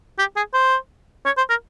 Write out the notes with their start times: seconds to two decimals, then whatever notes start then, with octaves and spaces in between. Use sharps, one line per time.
0.18 G4
0.36 G#4
0.54 C5
1.26 C#5
1.37 C5
1.49 A#4